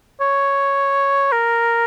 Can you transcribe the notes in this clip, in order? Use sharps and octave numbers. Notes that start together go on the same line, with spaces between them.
C#5
A#4